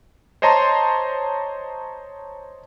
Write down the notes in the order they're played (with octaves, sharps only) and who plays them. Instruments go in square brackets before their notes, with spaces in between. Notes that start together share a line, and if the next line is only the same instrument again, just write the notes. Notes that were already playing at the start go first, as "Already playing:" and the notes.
[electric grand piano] C5 C#5 D#5 A5 A#5 C6